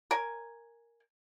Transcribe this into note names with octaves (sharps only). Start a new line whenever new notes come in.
A#4 C#5 G#5